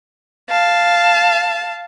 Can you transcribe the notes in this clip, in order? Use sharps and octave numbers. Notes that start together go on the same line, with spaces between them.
F5 A5